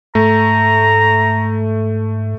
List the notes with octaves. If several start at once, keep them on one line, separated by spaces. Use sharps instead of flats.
G#2 A3 A#5